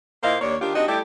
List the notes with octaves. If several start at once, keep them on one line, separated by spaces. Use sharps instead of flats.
A#2 A#3 E4 C5 D#5 F5
D#2 A#3 D4 C#5
D#3 D4 F4 G4
C4 D4 D#4 F#4 G4 D#5
G3 A3 E4 G4 A4 D5